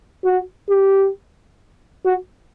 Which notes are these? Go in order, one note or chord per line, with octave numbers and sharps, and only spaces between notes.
F#4
G4
F#4